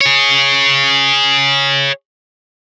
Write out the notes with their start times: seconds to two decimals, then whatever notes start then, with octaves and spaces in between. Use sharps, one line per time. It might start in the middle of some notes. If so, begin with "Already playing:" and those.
0.01 G#4 C#5